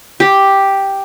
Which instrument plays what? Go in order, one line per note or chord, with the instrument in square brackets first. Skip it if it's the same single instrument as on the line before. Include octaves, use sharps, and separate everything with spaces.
[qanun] G4